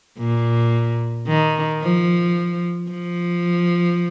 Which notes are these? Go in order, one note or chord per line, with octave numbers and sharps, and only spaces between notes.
A#2
D#3
F3
F3